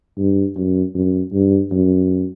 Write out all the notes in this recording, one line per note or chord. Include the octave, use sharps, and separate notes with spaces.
G2
F#2
F#2
G2
F#2